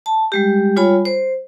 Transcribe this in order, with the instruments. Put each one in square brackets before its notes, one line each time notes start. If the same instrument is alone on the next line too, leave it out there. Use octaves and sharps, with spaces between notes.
[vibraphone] A5
G3 G#3 G4
G3 F4 C#5 G#5 B5
C5